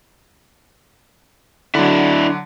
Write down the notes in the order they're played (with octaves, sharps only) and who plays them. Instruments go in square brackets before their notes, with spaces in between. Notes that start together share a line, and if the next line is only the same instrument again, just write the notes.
[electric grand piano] D3 F#3 [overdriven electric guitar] D4 E4